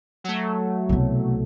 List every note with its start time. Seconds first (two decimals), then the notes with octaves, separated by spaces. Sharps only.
0.24 F#3 A3
0.89 C2 B2